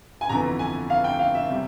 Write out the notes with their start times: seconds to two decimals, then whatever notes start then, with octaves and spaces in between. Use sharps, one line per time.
0.21 G#5
0.29 G1 F2 E3 A#5
0.59 G#5
0.90 F5
1.04 G5
1.19 F5
1.35 E5
1.50 C3 G3 C4